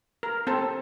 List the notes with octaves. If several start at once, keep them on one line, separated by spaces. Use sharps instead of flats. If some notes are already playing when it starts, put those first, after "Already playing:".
A#4
C4 A4 A5